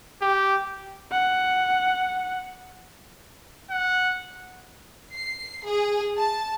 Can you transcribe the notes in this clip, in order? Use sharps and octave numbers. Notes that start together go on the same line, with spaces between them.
G4
F#5
F#5
C7
G#4
A5